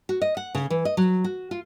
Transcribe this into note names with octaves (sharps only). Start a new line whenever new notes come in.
F#4
D#5
F#5
C#3
E3
D#5
F#3
F#4
F4